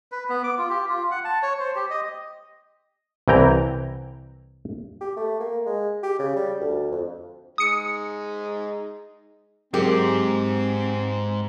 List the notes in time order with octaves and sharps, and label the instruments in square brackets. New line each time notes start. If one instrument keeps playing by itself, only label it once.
[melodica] B4
B3
D6
F4
G4
F4
F#5
A5
C#5
C5
G4
D#5
[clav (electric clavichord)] C2 E3 G5 A#5
[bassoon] G4
A3
A#3
G#3
G4
C#3
G3
D2
F2
[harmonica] G#3 D#4 [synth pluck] D#6 C#7
[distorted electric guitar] G#2 [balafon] F#3 G#4 A#4 [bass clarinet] C4 [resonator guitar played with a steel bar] G4